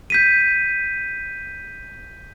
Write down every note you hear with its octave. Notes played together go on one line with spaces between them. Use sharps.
G6 B6 D#7